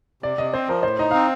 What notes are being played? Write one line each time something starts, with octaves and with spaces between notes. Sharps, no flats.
C3 D5
C3 D#5
C4 C5
F3 A#4
A2 C5
D#4 D#5
C4 F5